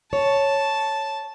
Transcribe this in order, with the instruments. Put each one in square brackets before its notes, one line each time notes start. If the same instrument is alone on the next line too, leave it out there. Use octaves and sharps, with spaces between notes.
[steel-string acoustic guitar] C#5 [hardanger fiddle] A5